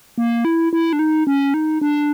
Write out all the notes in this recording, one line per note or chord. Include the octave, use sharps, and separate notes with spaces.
A#3
E4
E4
D4
D#4
C#4
D#4
D4